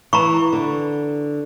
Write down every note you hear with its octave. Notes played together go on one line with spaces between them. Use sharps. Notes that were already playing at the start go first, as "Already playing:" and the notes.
E3 A#5 B5 C#6
D3